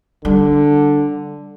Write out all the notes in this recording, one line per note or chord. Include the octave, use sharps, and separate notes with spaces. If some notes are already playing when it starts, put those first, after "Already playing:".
D3 G3